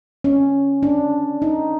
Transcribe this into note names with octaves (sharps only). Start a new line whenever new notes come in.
C#4
D4
D#4